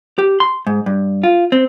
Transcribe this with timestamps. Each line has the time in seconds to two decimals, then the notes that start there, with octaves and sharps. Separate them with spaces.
0.18 G4
0.40 C6
0.67 G#2
0.86 G2
1.24 F4
1.52 C4